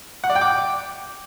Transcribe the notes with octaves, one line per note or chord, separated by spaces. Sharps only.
F#5
D5
G5
D6